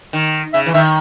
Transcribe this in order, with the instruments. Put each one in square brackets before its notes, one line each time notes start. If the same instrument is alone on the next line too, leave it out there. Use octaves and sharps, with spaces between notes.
[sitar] D#3
[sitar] C#3 [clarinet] E5
[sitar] E3
[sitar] D#3 [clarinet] E5